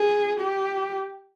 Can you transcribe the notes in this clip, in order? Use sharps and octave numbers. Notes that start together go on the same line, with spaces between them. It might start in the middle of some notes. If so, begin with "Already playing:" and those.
Already playing: G#4
G4